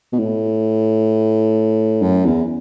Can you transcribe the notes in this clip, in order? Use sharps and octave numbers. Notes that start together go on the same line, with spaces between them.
B2
A2
F#2
E2